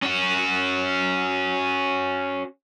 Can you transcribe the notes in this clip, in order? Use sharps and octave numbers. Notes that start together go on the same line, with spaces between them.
C#4 F#4